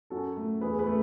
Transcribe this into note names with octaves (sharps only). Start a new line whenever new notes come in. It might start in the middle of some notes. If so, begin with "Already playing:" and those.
F#2 F#4 A4
A3
E2 G#4 B4
G#4 B4
A3